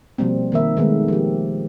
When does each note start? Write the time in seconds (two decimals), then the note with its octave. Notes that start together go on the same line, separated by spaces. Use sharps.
0.18 B2 F3 G3 A#3 C4
0.52 D#3 A#3 A#4 E5
0.77 D#3 G#3 A3 B3
1.08 F3 G4